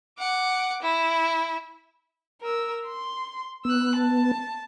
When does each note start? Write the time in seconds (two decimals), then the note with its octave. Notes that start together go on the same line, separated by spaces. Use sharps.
0.18 F#5 D6
0.82 E4
2.41 A#4 E6
2.86 C6
3.65 B3 E6 F#6
3.96 A5